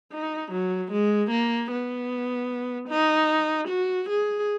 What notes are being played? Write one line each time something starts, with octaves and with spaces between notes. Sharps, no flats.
D#4
F#3
G#3
A#3
B3
D#4
F#4
G#4